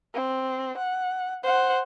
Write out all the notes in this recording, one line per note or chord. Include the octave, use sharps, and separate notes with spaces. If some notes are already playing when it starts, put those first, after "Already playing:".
C4
F#5
C5 F#5